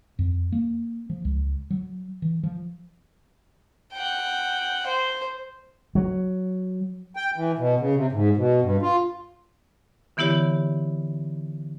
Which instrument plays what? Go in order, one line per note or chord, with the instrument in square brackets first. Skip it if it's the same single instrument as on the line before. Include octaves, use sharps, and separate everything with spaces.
[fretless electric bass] F2
A#3
F3
C#2
F#3
E3
F3
[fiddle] F#5 G5
C5
[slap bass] F#3
[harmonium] G5
E3
B2
C#3
C3
G#2
B2
G2
F4
[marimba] D3 E3 B3 E4 G4 C#5